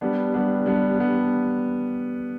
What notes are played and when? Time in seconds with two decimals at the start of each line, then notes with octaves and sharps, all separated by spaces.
0.01 G3 B3 D4
0.34 G3 B3 D4
0.66 G3 B3 D4
0.99 G3 B3 D4